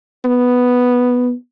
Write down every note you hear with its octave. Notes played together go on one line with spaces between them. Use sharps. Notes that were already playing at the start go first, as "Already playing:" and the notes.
B3